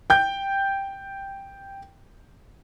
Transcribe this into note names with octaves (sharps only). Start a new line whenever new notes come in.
G5 G6